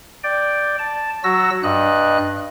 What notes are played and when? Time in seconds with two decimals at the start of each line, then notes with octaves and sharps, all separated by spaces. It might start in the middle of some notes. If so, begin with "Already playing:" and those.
0.24 D5 G5
0.79 A5
1.24 F#3 F#4 E6 A#6
1.63 G2 D#5 F#6